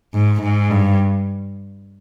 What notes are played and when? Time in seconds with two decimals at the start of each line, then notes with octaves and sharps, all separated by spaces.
0.14 G#2
0.42 G#2
0.70 G2